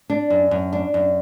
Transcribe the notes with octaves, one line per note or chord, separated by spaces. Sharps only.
D4
F#2
F#2
D4
F#2